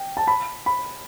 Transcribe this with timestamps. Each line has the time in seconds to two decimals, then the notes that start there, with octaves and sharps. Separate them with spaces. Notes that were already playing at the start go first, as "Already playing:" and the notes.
Already playing: G5
0.17 A5
0.27 B5
0.66 B5